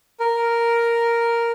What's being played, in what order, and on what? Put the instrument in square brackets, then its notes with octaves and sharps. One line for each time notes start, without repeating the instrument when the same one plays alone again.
[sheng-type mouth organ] A#4